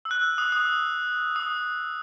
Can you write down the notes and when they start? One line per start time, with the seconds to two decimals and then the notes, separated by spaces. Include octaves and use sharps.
0.05 E6
0.11 F#6
0.38 D#6
0.52 D#6
1.36 D#6